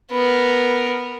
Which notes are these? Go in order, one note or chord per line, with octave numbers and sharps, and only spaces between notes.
B3 A#4